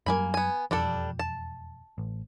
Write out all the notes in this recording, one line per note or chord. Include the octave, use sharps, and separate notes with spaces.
F#2 F#3 G3 A#3 G#5 B5
B3 G#5
E1 F2 F3 G3 D4 A4
A5
A1